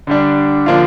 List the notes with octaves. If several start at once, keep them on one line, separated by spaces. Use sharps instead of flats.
D3 G3 D4
D3 F3 A#3 D4 F4